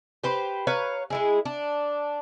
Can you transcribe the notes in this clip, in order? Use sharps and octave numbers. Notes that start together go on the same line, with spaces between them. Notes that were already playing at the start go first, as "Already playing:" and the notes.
G4 B4 C5
B4 C#5 F5 A#5
G#3 E4 G#4
D4